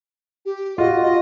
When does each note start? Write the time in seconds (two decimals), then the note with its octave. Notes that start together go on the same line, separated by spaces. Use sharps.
0.46 G4
0.78 F4 F#4 D#5
1.02 D#5